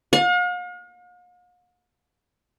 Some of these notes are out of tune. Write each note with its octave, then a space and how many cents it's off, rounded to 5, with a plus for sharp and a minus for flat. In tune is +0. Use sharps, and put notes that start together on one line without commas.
F5 +45